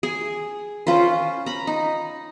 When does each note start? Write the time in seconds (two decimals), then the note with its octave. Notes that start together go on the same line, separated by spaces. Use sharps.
0.03 G#4
0.87 C#4 F4 B4 C5
1.46 A#5 B5
1.67 D#4